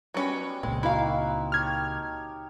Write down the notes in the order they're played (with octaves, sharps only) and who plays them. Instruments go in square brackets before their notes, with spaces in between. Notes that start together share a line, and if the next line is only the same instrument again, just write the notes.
[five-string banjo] F#3 C#4 [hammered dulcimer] G3 B3
[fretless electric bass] C#2 A#2 [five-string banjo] G#3 [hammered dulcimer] C4
[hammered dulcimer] A#3 D#4 F#4 [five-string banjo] E4 F5
[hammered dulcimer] G4 C#5 A5 [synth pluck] F6 G#6